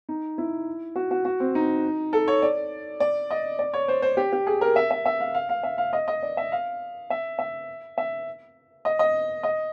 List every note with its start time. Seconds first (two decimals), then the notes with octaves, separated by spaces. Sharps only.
0.09 D#4
0.38 E4
0.96 F#4
1.11 F#4
1.25 F#4
1.40 C4
1.55 D#4
2.13 A4
2.28 C#5
2.42 D5
3.00 D5
3.31 D#5
3.59 D5
3.73 C#5
3.88 C5
4.02 C5
4.17 G4
4.32 G4
4.47 G#4
4.61 A#4
4.76 E5
4.91 E5
5.06 E5
5.20 F5
5.34 F5
5.49 F5
5.63 E5
5.78 F5
5.93 D#5
6.08 D#5
6.23 D5
6.37 E5
6.52 F5
7.10 E5
7.39 E5
7.98 E5
8.85 D#5
8.99 D#5
9.43 D#5